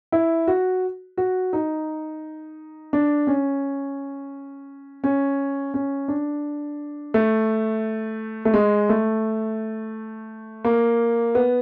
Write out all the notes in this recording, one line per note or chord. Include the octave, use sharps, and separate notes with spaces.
E4
F#4
F#4
D#4
D4
C#4
C#4
C#4
D4
A3
A3
G#3
A3
A#3
B3